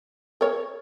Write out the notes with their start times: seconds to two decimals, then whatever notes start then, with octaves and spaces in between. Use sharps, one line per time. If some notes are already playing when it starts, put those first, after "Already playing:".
0.41 A#4 C#5